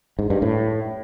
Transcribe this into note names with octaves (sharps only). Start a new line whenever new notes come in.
G#2
G2
A2